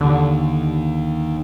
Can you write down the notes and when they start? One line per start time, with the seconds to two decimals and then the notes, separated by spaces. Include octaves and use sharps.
0.01 D#2 D3